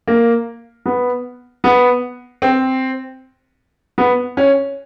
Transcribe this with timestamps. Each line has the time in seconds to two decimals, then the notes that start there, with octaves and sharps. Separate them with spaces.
0.08 A#3
0.86 B3
1.64 B3
2.42 C4
3.98 B3
4.37 C#4